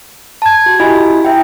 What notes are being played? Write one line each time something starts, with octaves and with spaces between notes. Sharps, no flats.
A5 G#6
F#4
E4 F4 G4 D#5 G#5 B5
E4 E5 G5